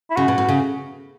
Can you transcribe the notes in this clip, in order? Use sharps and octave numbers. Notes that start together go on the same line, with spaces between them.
E4
C#3 F#4
B2
A2
C#3